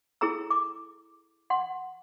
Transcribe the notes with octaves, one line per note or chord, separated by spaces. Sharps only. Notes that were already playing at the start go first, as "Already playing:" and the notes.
E4 G#4 A4 A#5 E6
D6
F#5 C6